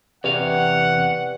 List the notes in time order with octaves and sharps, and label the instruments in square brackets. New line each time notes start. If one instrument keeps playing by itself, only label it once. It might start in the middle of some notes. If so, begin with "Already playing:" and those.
[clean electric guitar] E2 C3 F5 [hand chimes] G4 B4 D5 [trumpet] F#5